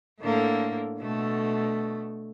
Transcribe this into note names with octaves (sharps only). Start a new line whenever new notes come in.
A2 D3 A#3
B2 D3 A3